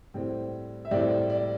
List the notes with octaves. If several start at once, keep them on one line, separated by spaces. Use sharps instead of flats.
A2 G3 C4
E5
A2 G3 C4 D5
D5